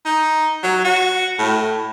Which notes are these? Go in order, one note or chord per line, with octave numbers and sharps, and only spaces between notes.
D#4
F#3
F#4
A2